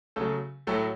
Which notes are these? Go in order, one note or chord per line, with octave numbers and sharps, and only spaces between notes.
C#3 F#3 A3 A4
A2 F#3 A3 A4